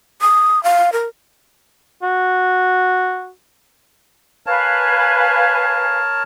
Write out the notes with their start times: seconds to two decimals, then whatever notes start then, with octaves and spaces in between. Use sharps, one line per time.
0.21 D#6
0.64 F5
0.93 A#4
2.03 F#4
4.46 A#4 B4 C#5 F5 G#5 A5